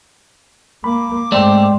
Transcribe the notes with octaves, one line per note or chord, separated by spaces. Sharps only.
A#3 B5 D6
G#2 A3 C4 D5 G5 C6